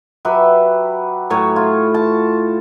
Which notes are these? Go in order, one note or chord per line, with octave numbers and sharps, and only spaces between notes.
F#3 G4 B4 E5
A2 F#3 C#5 G#5
F4
A5